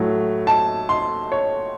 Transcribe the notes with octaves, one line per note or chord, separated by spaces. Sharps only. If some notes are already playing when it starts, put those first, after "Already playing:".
Already playing: A2 F#3 A3
A5
C6
C#5